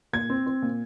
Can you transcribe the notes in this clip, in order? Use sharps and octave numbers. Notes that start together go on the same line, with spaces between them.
A#2 G#6
C4
C4
A#2